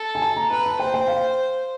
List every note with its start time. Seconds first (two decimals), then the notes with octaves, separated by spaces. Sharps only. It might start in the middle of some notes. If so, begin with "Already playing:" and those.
Already playing: A4
0.15 G#5
0.22 A5
0.37 A#5
0.51 B4 A#5
0.66 A5
0.79 C5 G5
0.94 G5
1.08 F5